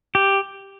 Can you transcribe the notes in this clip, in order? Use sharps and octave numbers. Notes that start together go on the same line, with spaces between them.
G4